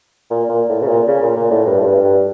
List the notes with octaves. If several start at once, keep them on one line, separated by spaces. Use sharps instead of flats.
A#2
A#2
A2
C#3
A#2
C#3
A#2
A#2
A2
G2
A2
G2
G2